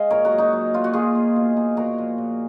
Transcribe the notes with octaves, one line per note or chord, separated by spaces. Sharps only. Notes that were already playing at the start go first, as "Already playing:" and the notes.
Already playing: G#3 D#5 F5 G#5
A#2 A#4 C#5
F#4 A#4
F#3
D#4 F#4
F#3
A#2 F4
F#4
A#3 F4 G#4
A#3
B2
A#3
A#2 F#4 A#4
F3
A#2